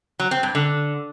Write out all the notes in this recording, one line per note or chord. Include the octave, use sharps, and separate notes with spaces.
F#3
C4
G2
D3